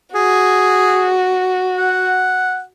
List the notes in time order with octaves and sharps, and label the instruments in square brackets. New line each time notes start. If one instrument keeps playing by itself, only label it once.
[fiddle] F#4 [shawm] G#4
[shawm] F#5